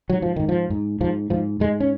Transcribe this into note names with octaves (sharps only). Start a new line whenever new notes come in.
G#2 F#3
F3
G#2 D#3
F3
G#2
G#2 F3
G#2 F3
G#2 G#3
C#4